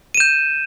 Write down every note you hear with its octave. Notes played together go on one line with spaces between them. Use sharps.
G6 D#7 E7